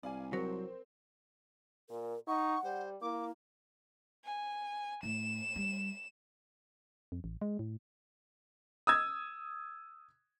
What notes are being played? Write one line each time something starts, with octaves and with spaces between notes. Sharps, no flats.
C2 D5 F5 G#5
F#3 C4 A#4
A#2 A#4
D#4 F#5 C#6
G3 C5
A#3 E4 D6
G#5
A2 E7
G3
F2
A1
G#3
A2
D#6 E6 G#6